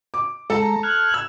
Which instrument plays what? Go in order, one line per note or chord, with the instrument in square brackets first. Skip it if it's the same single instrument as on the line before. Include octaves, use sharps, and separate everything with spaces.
[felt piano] D6
[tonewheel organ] G#3 A#5 [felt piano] A4 A5
[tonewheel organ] F6 F#6 G#6
[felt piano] E6